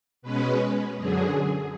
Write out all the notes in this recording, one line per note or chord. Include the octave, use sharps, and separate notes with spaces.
B2 G#3 C#4 B4
F#2 D3 F#3 G#4